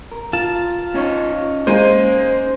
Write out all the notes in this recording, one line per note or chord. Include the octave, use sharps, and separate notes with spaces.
A#4
F4 A5
C#4 D#4 C#5
G#3 A#3 C5 D#7